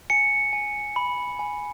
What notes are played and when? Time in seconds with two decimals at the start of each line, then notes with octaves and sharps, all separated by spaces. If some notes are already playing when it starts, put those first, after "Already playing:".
0.10 G#5 C#7
0.53 G#5
0.96 B5
1.39 G#5